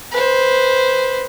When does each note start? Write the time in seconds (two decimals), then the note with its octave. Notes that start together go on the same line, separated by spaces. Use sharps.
0.12 B4 C5